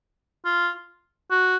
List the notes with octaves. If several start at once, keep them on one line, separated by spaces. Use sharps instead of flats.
F4
F#4